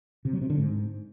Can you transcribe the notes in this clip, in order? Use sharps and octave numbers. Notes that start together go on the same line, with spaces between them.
C3
F#3
C3
D3
G#2